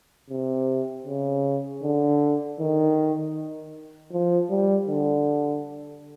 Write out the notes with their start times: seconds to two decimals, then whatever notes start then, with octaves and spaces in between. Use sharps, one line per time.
0.30 C3
1.06 C#3
1.83 D3
2.59 D#3
4.12 F3
4.50 G3
4.88 D3